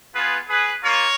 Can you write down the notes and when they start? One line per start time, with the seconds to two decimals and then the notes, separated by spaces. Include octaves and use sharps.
0.15 B3 F4 G#4 B4
0.49 G#4 B4
0.83 A#3 F4 A#4 C#5